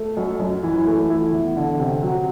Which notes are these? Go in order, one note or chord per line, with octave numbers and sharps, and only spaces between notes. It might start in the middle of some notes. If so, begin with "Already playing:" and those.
Already playing: A3
F#2
F#2
E3
A3
E4
E2
D3
C3
F#3